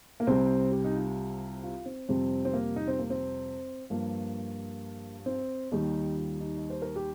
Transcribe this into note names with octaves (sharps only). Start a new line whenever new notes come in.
A#3
C2 C3 G3 C4
G4
D#4
F4
F4
C4
F2 C3 G3 C4
C4
A#3
D#4
C4
A#3
C4
G2 F3 A#3
C4
D#2 D#3 G3 D#4
F4
D#4
D#5
C5
A#4
G4